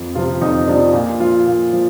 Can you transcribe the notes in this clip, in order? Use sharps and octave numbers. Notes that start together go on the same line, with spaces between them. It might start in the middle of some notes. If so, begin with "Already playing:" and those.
Already playing: F2
C3 F3 F4
F2 D#4
C3 F3 D4
A#2
F3 F4
A#2
F3